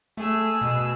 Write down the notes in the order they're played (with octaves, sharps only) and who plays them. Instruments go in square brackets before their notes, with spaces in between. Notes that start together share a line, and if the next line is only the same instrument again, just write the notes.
[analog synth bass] A3 [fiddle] G#4 E6
[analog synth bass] B2